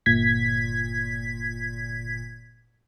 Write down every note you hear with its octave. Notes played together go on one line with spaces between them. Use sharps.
G1 A#2 G#6 B6